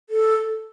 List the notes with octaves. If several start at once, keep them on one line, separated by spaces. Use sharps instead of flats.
A4